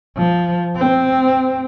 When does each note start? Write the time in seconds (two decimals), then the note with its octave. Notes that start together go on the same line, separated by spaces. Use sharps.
0.17 F3
0.77 C4